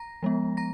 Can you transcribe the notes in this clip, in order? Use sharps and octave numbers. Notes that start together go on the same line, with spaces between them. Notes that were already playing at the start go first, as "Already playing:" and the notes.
Already playing: A#5 A#6
F3 G#3 B3
A#5 A#6